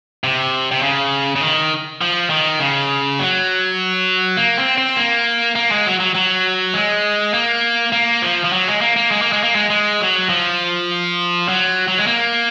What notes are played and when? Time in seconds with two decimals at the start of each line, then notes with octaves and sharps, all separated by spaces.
0.24 C3
0.71 C3
0.83 C#3
1.36 C#3
1.41 D#3
2.01 F3
2.30 D#3
2.60 C#3
3.19 F#3
4.37 A#3
4.57 C4
4.78 C4
4.97 A#3
5.55 A#3
5.71 G#3
5.86 F#3
6.00 F#3
6.15 F#3
6.74 G#3
7.34 A#3
7.92 A#3
8.22 F3
8.44 F3
8.53 F#3
8.67 G#3
8.81 A#3
8.96 A#3
9.11 G#3
9.22 A#3
9.33 G#3
9.43 A#3
9.55 G#3
9.70 G#3
10.01 F#3
10.29 F3
11.49 F#3
11.88 F#3
11.98 G#3
12.07 A#3